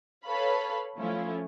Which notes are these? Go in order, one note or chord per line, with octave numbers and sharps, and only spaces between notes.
A4 B4 C#5 F5 B5
F3 A3 C#4 E4 F4